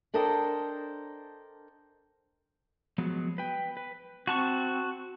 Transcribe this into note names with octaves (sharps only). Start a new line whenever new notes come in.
D4 A4 A#4 C5 D#5 G5
F3 F#3 G#3 B3
B4 G5
B4
C4 F#4 A5 C#6